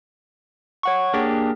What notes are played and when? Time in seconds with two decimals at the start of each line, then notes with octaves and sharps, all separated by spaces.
0.83 C#5 F#5 C#6
1.14 A#3 D4 G4 G#4